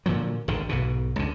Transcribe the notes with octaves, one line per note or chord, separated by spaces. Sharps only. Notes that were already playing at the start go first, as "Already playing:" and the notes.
A#2 D3 F3 F#3
G#1 D3 D#3
B1 G#2 B2
C#2 D3